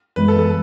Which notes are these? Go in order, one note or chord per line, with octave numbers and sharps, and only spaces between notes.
F#2 E3 G#3 B3 B4
A4
A4